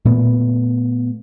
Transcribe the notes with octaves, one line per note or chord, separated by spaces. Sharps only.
A#2 A3 B3